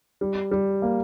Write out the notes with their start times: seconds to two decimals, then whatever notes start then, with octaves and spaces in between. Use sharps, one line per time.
0.21 G3
0.51 G3
0.82 A#3